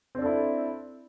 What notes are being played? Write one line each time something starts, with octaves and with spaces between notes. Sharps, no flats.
C4 D4 E4 A4